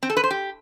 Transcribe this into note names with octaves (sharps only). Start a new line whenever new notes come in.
C4
A4
B4
C5
G4